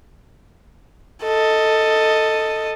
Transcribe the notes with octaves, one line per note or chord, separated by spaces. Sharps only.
A4 D#5